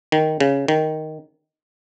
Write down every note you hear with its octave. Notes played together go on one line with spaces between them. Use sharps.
D#3
C#3
D#3